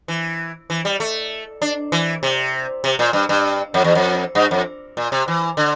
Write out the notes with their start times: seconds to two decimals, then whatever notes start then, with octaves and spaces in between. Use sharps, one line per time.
0.08 E3
0.70 E3
0.85 G3
1.00 A3
1.62 D4
1.92 E3
2.23 C3
2.84 C3
2.99 A#2
3.13 G2
3.29 G2
3.74 F2
3.84 E2
3.95 F2
4.35 G2
4.51 F2
4.97 A#2
5.12 C3
5.28 E3
5.57 D3